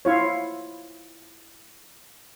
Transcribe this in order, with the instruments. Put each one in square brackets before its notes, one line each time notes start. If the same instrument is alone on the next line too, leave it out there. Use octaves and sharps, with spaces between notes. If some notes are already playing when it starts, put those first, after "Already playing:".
[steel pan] E4 F4 C#5